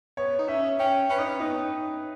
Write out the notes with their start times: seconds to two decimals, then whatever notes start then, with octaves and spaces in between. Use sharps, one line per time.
0.17 B3 C#5
0.39 D#4
0.48 C#4 E5
0.79 C#4 G5
1.09 C#4 B4
1.18 D#4
1.28 C#4
1.40 B3 D#4